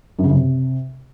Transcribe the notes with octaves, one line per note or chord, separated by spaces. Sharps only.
F#2
C#3
F#2
C3